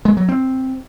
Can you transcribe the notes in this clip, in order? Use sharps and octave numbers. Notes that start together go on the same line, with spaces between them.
G#3
F#3
C4